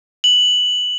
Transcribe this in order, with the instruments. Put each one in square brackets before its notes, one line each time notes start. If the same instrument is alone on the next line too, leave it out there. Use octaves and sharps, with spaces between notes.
[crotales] F#7